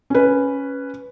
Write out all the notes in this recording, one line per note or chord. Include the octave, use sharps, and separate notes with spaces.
C#4 B4